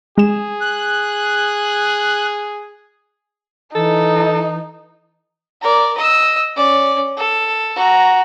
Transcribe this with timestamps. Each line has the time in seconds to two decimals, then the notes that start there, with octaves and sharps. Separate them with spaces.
0.18 G#3 G#4 E7
0.61 F#6
3.75 E3 D#4 A4
5.61 A#4 D5
5.98 D#5 E6
6.56 C#4 D5
7.17 A4
7.76 F#4 A#5